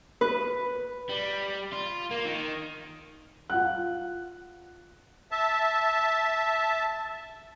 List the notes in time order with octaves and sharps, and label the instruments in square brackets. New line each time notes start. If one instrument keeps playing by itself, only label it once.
[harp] B4
[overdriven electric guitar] G3
F4
A#3
D#3
[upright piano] F4 F#5 F#6
[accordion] E5 A5